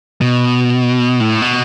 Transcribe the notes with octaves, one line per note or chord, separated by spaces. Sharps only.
B2
A2
B2